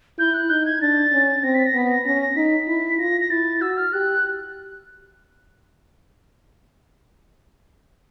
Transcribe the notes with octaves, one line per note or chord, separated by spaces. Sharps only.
E4 G6
F#6
D#4 G6
G#6
D4 A6
C#4
C4 A#6
B6
A#6
B3 B6
A#6
C#4 A#6
A#6
D#4 B6
E4
F4 A#6
A#6
E4 A6
F#4 E6
F6
G4 F#6